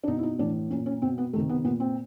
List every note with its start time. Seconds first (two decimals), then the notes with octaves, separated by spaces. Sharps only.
0.03 D4
0.08 B2 D#4
0.18 E4
0.23 D#4
0.39 A2 E3 D4
0.70 A#2 C#4
0.86 C#4
1.02 B2 C4
1.18 B3
1.33 C3 D#3 A3
1.49 B3
1.64 A#2 B3
1.80 C4